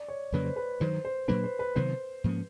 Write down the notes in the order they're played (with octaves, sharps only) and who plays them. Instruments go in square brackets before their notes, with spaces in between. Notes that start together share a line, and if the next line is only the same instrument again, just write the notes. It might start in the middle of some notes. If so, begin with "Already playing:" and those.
Already playing: [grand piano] D5
C#5
[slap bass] F2 C#3 F#3 A#3 [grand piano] B4
[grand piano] C5
B4
[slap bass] G2 D#3 F#3 [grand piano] C5
[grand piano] C5
[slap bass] A#2 F#3 A#3 D4 [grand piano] B4
[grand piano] C5
B4
[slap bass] C3 D#3 F#3 B3 [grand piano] C5
[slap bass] G#2 F3 A#3 C#4